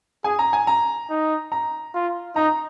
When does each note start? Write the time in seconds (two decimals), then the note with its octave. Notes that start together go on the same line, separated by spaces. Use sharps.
0.24 G#4 G#5
0.39 A#5
0.53 G#5
0.67 A#5
1.10 D#4
1.52 A#5
1.95 F4
2.36 D#4 A#5